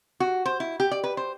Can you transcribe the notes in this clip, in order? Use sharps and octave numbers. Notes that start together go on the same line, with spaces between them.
F#4
C5
E4
G4
D5
B4
C5